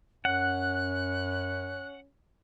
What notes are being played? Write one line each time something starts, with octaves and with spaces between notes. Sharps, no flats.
F#2 C#4 F#5 F#6